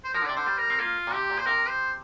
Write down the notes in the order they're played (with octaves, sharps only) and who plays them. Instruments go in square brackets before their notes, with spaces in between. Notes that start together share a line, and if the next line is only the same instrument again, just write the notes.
[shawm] C5
[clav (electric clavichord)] F3 [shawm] A#4
[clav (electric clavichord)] D3
[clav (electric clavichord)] C3 [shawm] D5
[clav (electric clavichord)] D3 [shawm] C5
[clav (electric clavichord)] G3
[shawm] A#4
[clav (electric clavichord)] C4
[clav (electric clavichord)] A#3 [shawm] F4
[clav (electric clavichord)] A#2
[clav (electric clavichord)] C3 [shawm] G4
[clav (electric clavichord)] A#2
[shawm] C5
[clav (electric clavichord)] C3 [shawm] A#4
[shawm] C5